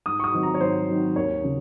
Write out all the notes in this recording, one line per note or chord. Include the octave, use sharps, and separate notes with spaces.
G#2 D#6
C#6
D#6
D#3 F#3 C4 D#4
A#5
C#5
G#2 C5
D#3 F#3 C4 D#4
D#2 C#5
C#3